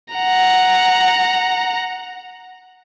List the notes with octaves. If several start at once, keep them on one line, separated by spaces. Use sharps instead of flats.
F#5 A#5